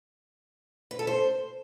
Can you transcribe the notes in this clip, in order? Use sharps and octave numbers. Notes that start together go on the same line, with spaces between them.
B4
A4
C5